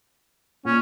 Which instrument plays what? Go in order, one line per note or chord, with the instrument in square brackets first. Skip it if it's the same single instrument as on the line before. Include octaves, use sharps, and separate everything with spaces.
[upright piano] A#2 [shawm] C#4